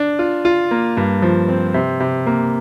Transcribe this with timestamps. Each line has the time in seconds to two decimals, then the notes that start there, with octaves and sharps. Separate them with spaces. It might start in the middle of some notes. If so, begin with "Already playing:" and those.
Already playing: D4
0.19 F4
0.45 F4
0.71 A#3
0.97 G2
1.22 F3
1.49 C4
1.74 C3
2.00 C3
2.26 A#3